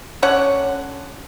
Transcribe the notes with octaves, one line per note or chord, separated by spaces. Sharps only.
D3 C#4 F#5